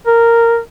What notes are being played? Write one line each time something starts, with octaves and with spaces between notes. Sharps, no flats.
A#4